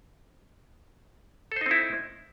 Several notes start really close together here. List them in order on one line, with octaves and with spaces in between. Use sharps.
A4 C5 D#4 C4 E4